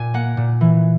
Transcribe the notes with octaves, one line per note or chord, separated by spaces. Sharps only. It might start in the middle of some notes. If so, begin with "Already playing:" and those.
Already playing: A#2 G#5
A#3 F#5
A#2
E3